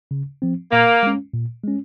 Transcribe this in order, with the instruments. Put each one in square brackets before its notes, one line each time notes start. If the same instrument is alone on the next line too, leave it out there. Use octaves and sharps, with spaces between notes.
[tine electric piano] C#3
F3 C4
[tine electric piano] A#2 [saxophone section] A#3
[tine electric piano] G#3 C#4
A#2
G#3 C#4